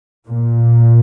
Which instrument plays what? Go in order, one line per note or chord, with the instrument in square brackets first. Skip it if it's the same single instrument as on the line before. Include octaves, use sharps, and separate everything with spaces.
[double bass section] A#2